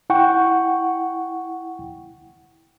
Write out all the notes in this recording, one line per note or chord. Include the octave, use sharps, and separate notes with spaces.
E4 F#5 G5 C#6